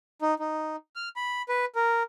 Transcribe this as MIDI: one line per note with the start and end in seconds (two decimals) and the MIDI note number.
0.22 0.34 63
0.39 0.76 63
0.96 1.09 89
1.16 1.42 83
1.49 1.65 71
1.75 2.03 70